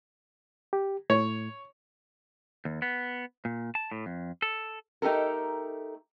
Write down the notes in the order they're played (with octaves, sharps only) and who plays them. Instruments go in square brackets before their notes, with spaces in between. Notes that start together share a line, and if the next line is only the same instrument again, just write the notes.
[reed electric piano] G4
[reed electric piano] A2 [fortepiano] C#5
[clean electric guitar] D#2
B3
A#2
A5
A2
F2
A4
[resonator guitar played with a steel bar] A3 D#4 G4 A4 A#4